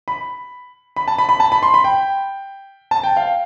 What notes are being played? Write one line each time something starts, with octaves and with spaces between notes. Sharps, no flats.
B5
B5
A5
B5
B5
A5
B5
C6
B5
G5
A5
G5
F5